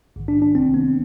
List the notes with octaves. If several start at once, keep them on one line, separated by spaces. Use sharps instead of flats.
A#1 G#2 D#3
D4
D4
C2 C3 D#3 C4
B3